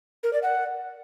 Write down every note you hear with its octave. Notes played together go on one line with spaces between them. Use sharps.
A#4
D5
F#5